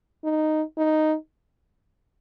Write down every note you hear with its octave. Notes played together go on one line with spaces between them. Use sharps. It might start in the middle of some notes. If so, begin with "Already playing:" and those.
D#4
D#4